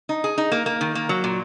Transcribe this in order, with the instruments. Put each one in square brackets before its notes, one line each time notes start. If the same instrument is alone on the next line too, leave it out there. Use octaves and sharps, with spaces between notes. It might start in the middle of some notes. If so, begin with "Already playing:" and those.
[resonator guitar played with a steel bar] D#4
G#4
D#4
A#3
A#3
D#3
A#3
F#3
A#2